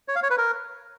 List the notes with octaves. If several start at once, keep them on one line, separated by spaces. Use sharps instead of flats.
C#5
F5
C#5
B4
A#4